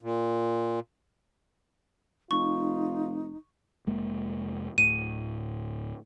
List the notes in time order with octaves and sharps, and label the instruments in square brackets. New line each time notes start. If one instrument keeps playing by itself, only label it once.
[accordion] A#2
[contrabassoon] F1 [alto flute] D#4 [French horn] F4 [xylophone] C#6
[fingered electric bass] F1 G#3 A#3
[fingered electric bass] D1 A2 [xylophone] D#7